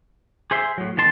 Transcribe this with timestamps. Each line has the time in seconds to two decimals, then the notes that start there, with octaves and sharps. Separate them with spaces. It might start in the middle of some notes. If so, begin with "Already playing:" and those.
0.51 G#4 C5 E5 C6
0.78 A2 F#3
0.97 E2 D#3 A5 C6